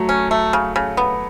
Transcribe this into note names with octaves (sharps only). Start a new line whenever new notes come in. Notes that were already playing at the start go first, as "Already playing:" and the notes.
Already playing: F#3 A3
C#4
A3
C#3
C#3
B3